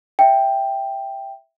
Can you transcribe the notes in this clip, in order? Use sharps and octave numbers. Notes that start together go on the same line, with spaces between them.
E5 G5